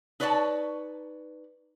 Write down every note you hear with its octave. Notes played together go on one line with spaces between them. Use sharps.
D#4 B4 C#5 D5 E5 A5